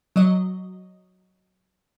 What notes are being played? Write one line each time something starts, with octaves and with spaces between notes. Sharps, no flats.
F#3 D#5